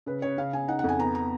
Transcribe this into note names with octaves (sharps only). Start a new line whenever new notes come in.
C#3 B4
C#3 C#5
C#3 F5
C#3 G#5
D#4 F#5
F#5
F2 G#5
B3 A#5
A#5